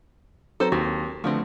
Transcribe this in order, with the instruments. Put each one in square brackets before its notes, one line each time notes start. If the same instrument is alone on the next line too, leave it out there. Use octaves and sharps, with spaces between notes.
[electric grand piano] F#3 C4 A#5 [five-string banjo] A4 B4 C5
[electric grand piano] D#2 [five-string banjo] C4 F#4
[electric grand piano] D3 A3 [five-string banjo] F3 B3 C4